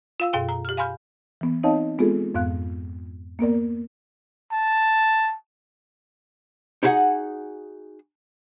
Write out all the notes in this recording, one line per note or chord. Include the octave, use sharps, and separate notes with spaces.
F4 F5 E6
F#2 B2 G#4 F5 G5
A#5
G4 F6
F5 G#5 B5 C6 F6 G6
E3 B3
C4 D#4 C#5 D#5 F5 A5
G#3 B3 C4 F4 G#4 A4
F2 G#2 B3 F5 F#6
A#3 B3 A#4 D5
A5
D#4 E4 F#4 G#4 F#5 G#5